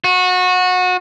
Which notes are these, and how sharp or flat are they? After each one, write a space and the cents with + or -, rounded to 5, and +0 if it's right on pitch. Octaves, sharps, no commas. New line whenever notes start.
F#4 -25